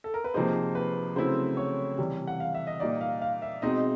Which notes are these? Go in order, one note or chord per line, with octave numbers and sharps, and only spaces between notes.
A4
A#4
B4
C3 F3 A#3 D#4 G#4 C5
B4
C#3 F#3 A3 C4 E4 C5
C#5
C3 E3 G3
F#5
F5
E5
D#5
A#2 G3 A#3 D#4 D5
F5
F5
E5
B2 G#3 C4 D#4 D#5